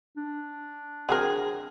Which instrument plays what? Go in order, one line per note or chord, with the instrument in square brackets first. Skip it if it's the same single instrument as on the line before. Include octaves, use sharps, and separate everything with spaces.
[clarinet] D4
[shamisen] F#3 C4 A#4 [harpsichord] G#4